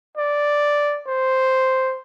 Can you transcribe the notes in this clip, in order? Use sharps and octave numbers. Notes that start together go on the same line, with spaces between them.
D5
C5